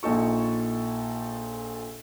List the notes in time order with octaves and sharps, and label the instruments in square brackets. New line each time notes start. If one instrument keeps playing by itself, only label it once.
[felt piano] A#1 A#2 D#4 A4 C#6